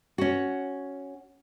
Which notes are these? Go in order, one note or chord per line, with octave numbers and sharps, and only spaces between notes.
C#4 F#4